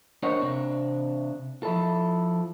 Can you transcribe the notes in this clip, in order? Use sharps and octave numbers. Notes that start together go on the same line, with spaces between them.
D4 A#4 C5 C#5 D#5 F#5
C3 C4 D4
F3 E4 A4